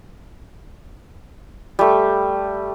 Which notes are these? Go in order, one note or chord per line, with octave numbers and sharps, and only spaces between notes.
G3 A3